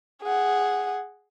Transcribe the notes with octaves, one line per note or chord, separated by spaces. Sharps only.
G#4 F#5